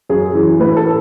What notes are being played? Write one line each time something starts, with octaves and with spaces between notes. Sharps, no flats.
F#2 G#4
E3
A2 B4
A4